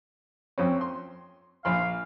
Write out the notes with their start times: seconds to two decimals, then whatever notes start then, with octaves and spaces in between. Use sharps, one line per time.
0.58 F2 C4 C#4
0.81 C6
1.65 A#1 F5 B5 C6